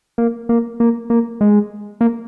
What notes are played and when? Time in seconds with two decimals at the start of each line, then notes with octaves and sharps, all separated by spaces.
0.18 A#3
0.49 A#3
0.80 A#3
1.10 A#3
1.41 G#3
2.01 A#3